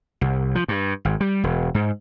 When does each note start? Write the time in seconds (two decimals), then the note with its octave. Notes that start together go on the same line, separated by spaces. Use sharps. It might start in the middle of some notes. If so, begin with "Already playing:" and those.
0.21 C2
0.55 F3
0.68 G2
1.05 G#1
1.20 G3
1.44 E1
1.75 G#2